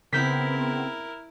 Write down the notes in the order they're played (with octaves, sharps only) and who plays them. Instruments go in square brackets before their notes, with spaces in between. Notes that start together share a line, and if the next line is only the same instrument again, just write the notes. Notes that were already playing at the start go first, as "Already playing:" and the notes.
[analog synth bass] C#3 [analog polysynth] B3 C4 [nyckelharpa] E4 A#4 [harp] G6 B6